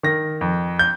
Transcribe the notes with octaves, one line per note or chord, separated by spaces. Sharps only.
D#3 A#6
F2
G6